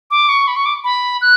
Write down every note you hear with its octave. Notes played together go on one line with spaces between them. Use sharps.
D6
C#6
B5
C#6
D6
B5
F#6